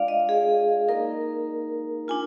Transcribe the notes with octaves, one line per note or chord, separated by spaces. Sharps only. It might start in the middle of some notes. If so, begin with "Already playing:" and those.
Already playing: G#3 D4 F4 D5 F5
D#5
G#4
A#3 D#4 A#4
D4 F4 G#5